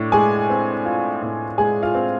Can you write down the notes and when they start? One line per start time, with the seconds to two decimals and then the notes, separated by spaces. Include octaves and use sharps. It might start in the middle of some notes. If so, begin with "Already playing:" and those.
Already playing: A2 D4 D5
0.12 G#3 G#4 G#5
0.50 C4
0.85 F4
1.22 A2
1.58 G#3 G#4 G#5
1.83 F4 F5
1.95 C4